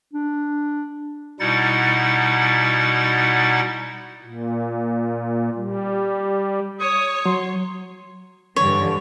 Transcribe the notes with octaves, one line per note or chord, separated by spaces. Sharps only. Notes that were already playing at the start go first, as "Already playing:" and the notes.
D4
B2 G3 D#4 E4 F#5 A6
A#2
G3
C#5 D#6
F#3 C6
G2 D3 E3 C#5